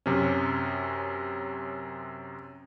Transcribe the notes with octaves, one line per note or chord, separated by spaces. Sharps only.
F#2 C3 C#4